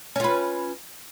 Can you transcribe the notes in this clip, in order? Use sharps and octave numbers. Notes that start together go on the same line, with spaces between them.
C#4 F4 B4